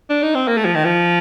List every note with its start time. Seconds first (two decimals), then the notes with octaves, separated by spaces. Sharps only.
0.10 D4
0.23 D#4
0.35 C4
0.48 A#3
0.57 A3
0.65 F3
0.75 D#3
0.85 F3